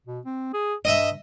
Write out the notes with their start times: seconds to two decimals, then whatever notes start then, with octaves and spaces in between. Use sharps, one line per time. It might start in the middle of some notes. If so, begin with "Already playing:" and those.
0.07 B2
0.25 C4
0.53 G#4
0.85 G2 D#5 E5